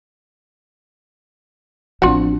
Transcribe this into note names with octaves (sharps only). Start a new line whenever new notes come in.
A1 F3 B3 C4 D4 F4 F#4